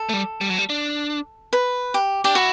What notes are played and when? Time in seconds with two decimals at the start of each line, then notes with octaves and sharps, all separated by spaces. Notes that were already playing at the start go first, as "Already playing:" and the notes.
Already playing: A4
0.09 A3
0.13 G3
0.41 G3
0.50 F#3
0.58 G3
0.70 D4
1.53 B4
1.94 G4
2.24 D4 G4
2.35 E4 F#4